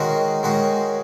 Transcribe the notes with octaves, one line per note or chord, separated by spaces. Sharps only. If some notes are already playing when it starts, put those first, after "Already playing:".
Already playing: D#3 G#3 C#4 F#4 A#4
D#3 G#3 C#4 F#4 A#4